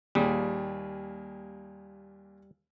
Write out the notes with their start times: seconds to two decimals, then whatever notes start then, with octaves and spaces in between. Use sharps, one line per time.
0.15 D#2 A#2 G3 G#4